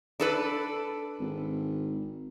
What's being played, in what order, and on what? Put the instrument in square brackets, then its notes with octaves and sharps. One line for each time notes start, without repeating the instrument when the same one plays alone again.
[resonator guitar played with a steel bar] D4 A4 B4
[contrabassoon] G#1